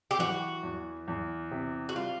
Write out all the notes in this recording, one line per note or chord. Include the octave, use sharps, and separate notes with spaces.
G4
E3 F#4
E2
E2
C3
F#4
G3 F4